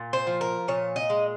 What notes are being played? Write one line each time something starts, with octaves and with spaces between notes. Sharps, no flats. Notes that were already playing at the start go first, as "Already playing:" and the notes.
Already playing: A#2
C5
F3
A#4
A#2 C#5
D#5
G#3